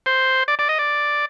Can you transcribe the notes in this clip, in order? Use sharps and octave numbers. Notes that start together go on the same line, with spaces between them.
C5
D5
D5
D#5
D5